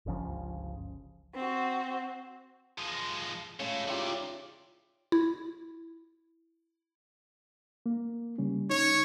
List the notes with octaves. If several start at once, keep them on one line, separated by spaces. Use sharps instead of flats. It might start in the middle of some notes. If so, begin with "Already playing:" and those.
G1 C#2 C#3 F3
C4 F#4
F3 G#3
A2 C#3 G#3
D#3 E4 F4 G4 D5
E4
A#3
C#3 G3 C#4
D#4 C#5